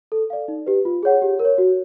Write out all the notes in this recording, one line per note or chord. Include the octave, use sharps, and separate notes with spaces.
A4
D5 F5
D#4
G4 B4
F4
G#4 C#5 F#5
G4
A#4
C#5
F#4